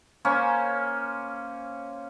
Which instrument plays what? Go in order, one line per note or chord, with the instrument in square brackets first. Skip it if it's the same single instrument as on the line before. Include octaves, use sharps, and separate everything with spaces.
[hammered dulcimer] A#3 C#4 C5